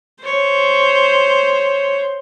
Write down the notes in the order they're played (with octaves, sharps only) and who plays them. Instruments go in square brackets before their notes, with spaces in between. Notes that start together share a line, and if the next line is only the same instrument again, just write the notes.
[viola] C5 [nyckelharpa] C#5